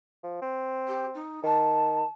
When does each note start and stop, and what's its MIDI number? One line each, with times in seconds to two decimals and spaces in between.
0.24 0.39 53
0.42 1.20 60
0.87 1.05 67
1.14 1.42 63
1.43 2.03 51
1.43 2.09 81